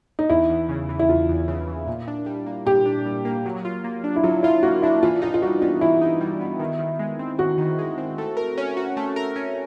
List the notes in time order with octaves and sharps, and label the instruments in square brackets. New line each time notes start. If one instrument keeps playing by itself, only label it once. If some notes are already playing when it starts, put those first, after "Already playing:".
[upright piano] D#4
[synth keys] E2 [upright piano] E4
[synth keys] E2
C#3
E3
[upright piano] E4
[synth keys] E2 [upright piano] F4
[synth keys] E2
C#3
E3
A#2
D4
G3
A#3
[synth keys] A#2 [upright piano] G4
[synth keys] D4
G3
A#3
F#3
F4
A#3
D4
[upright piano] E4
[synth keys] F#3 [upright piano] F4
[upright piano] E4 [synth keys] F4
[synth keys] A#3 [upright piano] F#4
[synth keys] D4 [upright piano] E4
[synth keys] E3 [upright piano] F4
[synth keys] D#4 [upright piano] F4
[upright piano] F4
[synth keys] G3 [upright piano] F#4
[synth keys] B3 [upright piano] F4
[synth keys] E3 [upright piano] E4
[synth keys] D#4
G3
B3
D#3
D#3
G#3
C4
[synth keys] D#3 [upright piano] F#4
[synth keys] D#3
G#3
C4
A3
A#4
C#4
F#4
A3
A#4
C#4